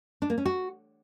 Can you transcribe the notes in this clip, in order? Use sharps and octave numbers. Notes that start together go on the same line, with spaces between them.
D4
A#3
C#4
F#4